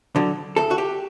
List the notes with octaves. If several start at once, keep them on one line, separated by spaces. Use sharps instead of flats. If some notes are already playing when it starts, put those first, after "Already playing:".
D3 F#3
D2 A4
F#4
G4